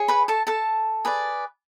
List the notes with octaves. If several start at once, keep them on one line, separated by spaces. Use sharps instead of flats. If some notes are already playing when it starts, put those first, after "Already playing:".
Already playing: G#4 C#5
B4 B5
A4 A5
A4 A5
G#4 B4 D5